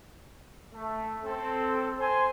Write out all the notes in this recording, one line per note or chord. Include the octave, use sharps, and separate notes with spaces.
A3
C4 A4
C5 G#5 C6